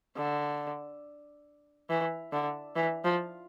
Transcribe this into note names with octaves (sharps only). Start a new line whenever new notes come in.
D3
E3
D3
E3
F3